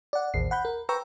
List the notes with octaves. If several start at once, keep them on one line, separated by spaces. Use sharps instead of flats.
D5 F#5
A1 D#2 C7
F#5 B5 G6
A#4
B4 G5 A#5 C#6 E6